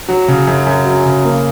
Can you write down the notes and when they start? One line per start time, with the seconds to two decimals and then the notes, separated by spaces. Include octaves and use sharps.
0.09 F#3
0.28 C#3
0.47 F#2
0.67 F#2
0.85 F#3
1.06 C#3
1.25 A#3